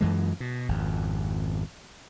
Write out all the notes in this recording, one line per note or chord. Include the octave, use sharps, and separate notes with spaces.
F#2 E3 G#3
B2
G#1 F2